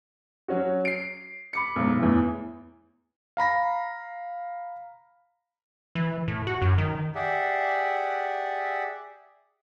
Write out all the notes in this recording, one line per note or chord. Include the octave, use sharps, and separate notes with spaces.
F#3 C#4 F#4
C7 D7
B5 D6 C#7
B1 G#2
E2 A2 E3
F5 A#5 B5 A#6
E3
A2
F#4
F#2
D#3
G4 G#4 D5 E5 F#5